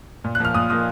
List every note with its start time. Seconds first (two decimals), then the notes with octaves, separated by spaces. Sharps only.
0.24 A#2
0.35 F#6
0.40 F3 A#3 F6
0.54 A#2 D#6
0.70 F3 A#3 D#6